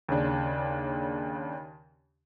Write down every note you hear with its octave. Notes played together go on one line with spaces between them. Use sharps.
D#2 C#3 D4